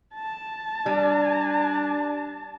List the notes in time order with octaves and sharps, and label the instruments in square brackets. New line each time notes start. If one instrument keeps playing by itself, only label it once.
[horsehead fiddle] A5
[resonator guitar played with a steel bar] G3 [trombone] D4